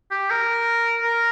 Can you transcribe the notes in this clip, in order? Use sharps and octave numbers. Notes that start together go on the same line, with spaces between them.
G4
A#4
A#4